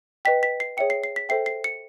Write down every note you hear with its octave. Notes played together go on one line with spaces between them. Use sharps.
B4 D#5 G5 B6
B6
C7
G#4 C#5 E5 G5 C#7
C7
C7
B6
A4 C5 E5 G5 C7
C7
C#7